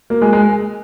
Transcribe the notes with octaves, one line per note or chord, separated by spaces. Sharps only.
A#3
G#3
G#3